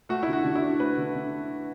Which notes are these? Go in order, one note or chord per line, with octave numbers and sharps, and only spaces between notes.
A3 F#4
D3 E4
F#4
D3
E4
D4
A3 B4
D3
D3